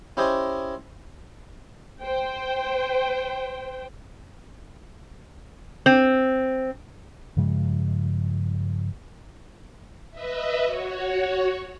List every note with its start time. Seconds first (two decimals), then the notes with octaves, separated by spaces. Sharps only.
0.17 C#4 E4 G4 C5 D#5 G#5
2.02 C5 G5
5.86 C4
7.37 G2 C#3 F3 G#3
10.11 B4 D#5 E5
10.65 F#4 C#5